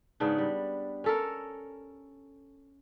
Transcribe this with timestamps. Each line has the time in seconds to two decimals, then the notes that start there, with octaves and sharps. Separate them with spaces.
0.20 G#2 C#3 B3 D4
0.38 G3
1.04 C#4 A4 A#4